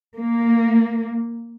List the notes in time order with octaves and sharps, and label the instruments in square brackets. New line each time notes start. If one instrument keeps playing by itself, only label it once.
[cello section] A#3